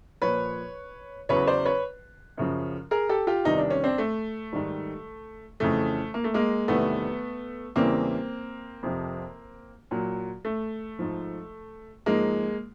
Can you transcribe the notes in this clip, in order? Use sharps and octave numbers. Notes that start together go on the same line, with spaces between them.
A#2 F3 B4 C#5
E2 C#3 F#3 B4 C#5
C5 D5
B4 C#5
F#2 C#3 F3
G#4 A#4
G4 A4
F4 G4
E2 C3 D#3 G3 D#4
D4
C#4
C4 D4
A3
G#2 D#3 G3
F2 C#3 E3 A3
A#3
A3
G#3 A#3
E2 C3 D#3 G3 A3 B3
E2 C#3 E3 G3 A#3 C4
F2 C3 F3
A#2 F#3
A3
G#2 F3
G#2 F3 G#3 A#3